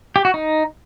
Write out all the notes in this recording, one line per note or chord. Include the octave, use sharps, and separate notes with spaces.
G4
F#4
D#4